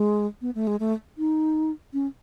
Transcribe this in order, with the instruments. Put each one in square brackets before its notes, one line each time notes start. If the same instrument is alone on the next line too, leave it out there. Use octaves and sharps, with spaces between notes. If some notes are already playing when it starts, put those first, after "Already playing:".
Already playing: [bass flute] G#3
B3
A3
G#3
A3
D#4
C#4